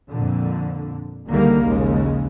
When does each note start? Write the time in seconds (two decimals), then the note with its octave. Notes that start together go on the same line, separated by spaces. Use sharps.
0.11 F2 A#2 D3
1.28 C#2 D3 D#3 G3 A#3
1.66 A#1 D#2 C#3 G#3